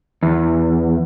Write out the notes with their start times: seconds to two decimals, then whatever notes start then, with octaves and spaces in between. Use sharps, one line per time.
0.23 E2